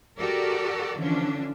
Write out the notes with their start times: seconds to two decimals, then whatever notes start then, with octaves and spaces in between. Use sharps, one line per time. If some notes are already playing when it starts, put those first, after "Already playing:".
0.19 F#4 G4 A4 A#4 D5
0.99 D3 E3 F3 C#4 D4